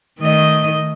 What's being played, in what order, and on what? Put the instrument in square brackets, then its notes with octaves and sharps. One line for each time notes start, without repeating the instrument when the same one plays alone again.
[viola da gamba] D#3 A3 D#5